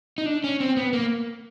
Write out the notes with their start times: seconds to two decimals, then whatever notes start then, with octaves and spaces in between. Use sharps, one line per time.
0.18 D#4
0.26 D4
0.44 C#4
0.60 C4
0.77 B3
0.93 A#3